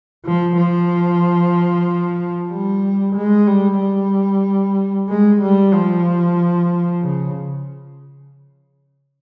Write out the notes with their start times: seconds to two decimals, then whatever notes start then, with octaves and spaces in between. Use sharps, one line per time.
0.25 F3
0.57 F3
2.51 G3
3.15 G#3
3.47 G3
3.80 G3
5.09 G#3
5.41 G3
5.73 F3
7.02 C#3